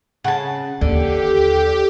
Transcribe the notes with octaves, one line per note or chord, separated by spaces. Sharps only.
C#3 F#5 A5
D#2 D3 G4